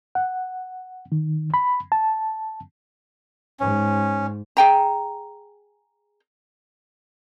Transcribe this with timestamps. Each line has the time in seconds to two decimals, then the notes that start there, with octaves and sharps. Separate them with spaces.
0.15 F#5
1.12 D#3
1.54 B5
1.92 A5
3.60 G#2 C#4
4.57 G#4 G5 A#5